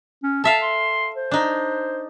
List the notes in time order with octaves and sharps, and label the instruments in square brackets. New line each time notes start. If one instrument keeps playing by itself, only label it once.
[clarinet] C#4
[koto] A4 E5 F5 [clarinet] A5
[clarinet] C6
C5
[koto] D4 D#4